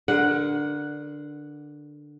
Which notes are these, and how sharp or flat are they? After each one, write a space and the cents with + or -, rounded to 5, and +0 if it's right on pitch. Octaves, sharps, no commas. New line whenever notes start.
D3 +5 A#4 +30 F#5 +0